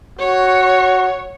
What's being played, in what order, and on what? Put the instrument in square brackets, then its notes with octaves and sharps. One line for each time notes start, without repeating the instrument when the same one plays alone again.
[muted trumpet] F#4 [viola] C#5